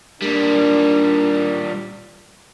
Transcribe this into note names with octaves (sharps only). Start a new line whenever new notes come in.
A#2 G3 D4 A#4